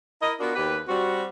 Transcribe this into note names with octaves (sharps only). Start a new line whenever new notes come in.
E4 A#4 D#5
B3 D4 F4 F#4 A#4
D#2 G4 B4
G3 C4 F#4